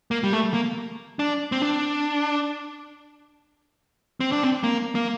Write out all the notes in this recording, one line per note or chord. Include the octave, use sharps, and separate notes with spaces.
A#3
G3
A3
A#3
D4
C4
D4
C4
D4
C4
A#3
A#3